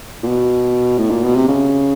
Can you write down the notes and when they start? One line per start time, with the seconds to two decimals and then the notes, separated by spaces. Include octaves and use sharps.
0.23 A#2
0.27 B2
0.98 A2
1.10 A#2
1.23 B2
1.36 C3
1.48 C#3